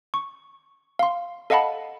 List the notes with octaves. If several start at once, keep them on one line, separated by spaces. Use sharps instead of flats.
C#6
F5 C6
A4 D#5 F5 F#5 A5 B5